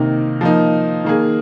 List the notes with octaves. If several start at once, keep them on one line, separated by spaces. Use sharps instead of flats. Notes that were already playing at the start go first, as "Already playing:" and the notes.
Already playing: C3 D#3 A#3 D#4
F3 A#3 D#4
D#3 A#3 G#4